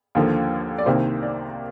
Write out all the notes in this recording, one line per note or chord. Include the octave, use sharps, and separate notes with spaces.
D#2 D3 F3 A#3
D5
C2 C3 D#3 A#3 C5
D5